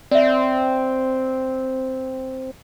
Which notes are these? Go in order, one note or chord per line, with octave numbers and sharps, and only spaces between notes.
C4 D5 E5